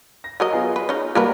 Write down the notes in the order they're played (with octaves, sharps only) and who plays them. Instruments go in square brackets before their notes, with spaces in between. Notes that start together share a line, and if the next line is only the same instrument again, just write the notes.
[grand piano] A#6
[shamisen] F#3 A#4 D#5
[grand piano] B3 F4 G#4
[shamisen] B4
C#4 D#4
[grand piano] G3 F#4 [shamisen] A#3 A#4 B4